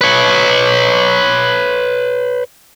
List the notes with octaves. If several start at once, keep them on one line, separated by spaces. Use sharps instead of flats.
B4 C#5